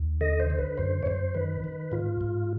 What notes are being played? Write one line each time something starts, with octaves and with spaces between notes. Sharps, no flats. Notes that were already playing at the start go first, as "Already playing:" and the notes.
Already playing: D#2
D3 D#5
C5
D3
B4
F#2 C5
C#5
F#2 C5
D#3 B4
D#3
G#2 F4
G#2